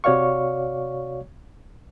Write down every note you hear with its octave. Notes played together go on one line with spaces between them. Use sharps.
C3 F#4 C#5 D5 F5 C#6